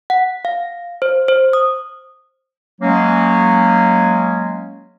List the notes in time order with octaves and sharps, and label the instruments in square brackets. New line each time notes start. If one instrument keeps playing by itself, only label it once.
[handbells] F#5
F5
C5
C5
D#6
[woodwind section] F#3 G#3 A#3 C#4